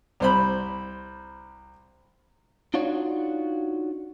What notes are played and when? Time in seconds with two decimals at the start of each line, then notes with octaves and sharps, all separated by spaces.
0.20 C2 C5 B5
2.74 D4 D#4 F4 F#4 C#5 D5